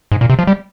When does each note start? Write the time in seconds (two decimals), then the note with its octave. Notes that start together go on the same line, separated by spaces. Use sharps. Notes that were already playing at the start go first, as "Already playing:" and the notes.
0.12 G#2
0.21 A#2
0.30 C3
0.39 F3
0.47 G3